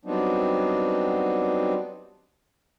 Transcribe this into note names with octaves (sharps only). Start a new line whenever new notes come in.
F#3 G3 B3 C4 D4 D#4